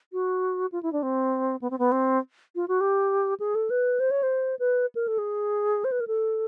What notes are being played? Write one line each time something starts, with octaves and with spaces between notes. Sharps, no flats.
F#4
F4
E4
D4
C4
B3
C4
B3
C4
F4
F#4
G4
G#4
A4
B4
C5
C#5
C5
B4
A#4
A4
G#4
C5
B4
A#4
A4